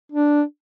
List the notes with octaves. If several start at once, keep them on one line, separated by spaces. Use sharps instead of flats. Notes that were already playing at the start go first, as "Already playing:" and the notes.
D4